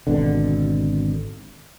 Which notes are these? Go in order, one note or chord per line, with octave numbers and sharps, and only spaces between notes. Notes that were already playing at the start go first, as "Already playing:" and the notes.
G#1 B2 D3